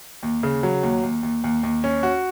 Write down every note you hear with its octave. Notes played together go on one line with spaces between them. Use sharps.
D#2
C#3
F#3
D#2
D#2
D#2
D#2
D#2
C#4
F#4